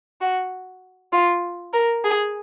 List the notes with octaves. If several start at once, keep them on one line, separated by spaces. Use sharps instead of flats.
F#4
F4
A#4
G#4